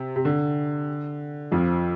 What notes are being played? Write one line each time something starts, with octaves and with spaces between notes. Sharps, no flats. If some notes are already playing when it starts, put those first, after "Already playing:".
Already playing: C3
C3
D3
F2 F3